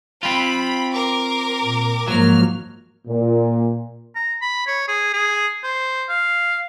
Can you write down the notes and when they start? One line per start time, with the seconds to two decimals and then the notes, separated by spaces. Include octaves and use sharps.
0.23 C4 F4 B5
0.93 A#4 D6
1.62 A#2
2.08 G#2 F3 F#3 A#3 F6
3.08 A#2
4.16 A#5
4.42 B5
4.67 C#5
4.88 G#4
5.13 G#4
5.64 C5
6.09 F5